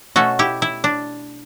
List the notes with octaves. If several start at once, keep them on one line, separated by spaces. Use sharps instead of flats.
B2 A3 C#4 F#4 A4
E4 G4
E4
D4